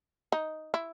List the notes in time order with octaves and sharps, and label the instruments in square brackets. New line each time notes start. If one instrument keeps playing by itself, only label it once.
[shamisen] D#4
E4